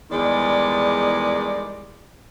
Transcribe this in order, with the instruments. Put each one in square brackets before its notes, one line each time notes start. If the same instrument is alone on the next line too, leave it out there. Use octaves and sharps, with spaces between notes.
[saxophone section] E2 D#3 G3 G#3 D5